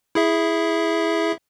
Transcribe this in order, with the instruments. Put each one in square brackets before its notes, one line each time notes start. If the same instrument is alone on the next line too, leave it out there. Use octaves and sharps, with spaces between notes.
[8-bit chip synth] E4 G#4 E5